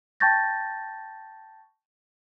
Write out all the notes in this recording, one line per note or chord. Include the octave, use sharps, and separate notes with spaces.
G5 A5 C#6 G6 A6 A#6